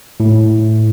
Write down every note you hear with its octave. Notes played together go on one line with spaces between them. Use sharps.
A2